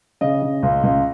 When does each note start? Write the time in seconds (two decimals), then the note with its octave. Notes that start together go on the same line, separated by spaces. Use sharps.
0.21 C#3 D#5
0.42 C#3
0.63 C#2
0.83 C#2